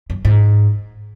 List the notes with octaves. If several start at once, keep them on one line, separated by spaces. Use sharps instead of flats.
F#2
G#2